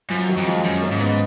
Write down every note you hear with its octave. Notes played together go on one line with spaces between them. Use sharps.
F#2 F3
D#3 F#3
F2
F3 G#3
F#2
A#3 C#4
G#2
B3 D#4